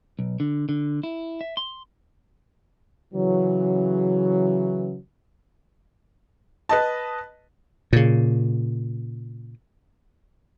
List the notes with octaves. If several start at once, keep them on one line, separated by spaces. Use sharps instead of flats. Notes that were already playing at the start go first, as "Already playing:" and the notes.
B1
D3
D3
E4
E5
C6
C#3 E3 F#3
B4 D#5 A5
A#2 C#3